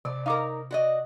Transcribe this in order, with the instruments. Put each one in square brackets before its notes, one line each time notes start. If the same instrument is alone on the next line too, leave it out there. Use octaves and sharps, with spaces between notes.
[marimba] C3 [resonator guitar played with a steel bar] D5
[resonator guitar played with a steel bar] D#4 A#4 [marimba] F5 D6
[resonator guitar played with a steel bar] F#4 D5 D#5